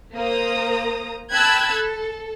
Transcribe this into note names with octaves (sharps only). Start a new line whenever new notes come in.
A#3 C5 A#5 D#6
G5 A5 B5 E6 F#6 G#6
A4